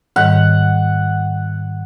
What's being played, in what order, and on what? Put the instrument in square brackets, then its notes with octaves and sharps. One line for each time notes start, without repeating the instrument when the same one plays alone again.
[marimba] G#2 D#3 G3 [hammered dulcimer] F#5